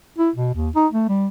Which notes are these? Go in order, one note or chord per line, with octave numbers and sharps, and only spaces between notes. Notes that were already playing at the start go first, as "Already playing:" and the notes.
E4
B2
D#2
D#4
A3
G3